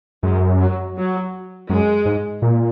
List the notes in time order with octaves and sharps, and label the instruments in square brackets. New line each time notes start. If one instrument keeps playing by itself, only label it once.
[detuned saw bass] F#2 [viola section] G#3
[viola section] F#3
F#3
[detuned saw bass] F#2 [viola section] G#3
[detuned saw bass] G#2
A#2